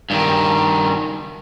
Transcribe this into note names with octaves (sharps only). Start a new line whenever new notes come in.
G2 D#3